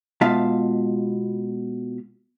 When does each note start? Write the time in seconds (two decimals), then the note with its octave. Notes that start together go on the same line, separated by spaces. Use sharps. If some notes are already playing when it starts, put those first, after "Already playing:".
0.21 B2 G#3 F4 E5 F5 A5